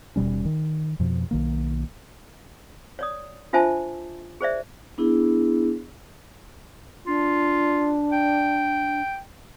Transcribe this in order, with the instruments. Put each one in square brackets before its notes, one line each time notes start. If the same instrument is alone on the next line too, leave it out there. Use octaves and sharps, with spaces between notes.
[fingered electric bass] D#1 B2 G3 C#4
D#3
F2 B2 F3
B1 D#3 A#3
[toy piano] C#5 D5 D#6
D4 F4 C5 E5 G#5 A5
G#4 C5 D5 E5
[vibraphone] B3 D4 E4 G#4
[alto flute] D4 [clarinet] F4
[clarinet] G5